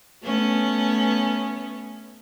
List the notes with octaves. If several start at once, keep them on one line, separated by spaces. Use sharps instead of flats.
A3 B3 C#4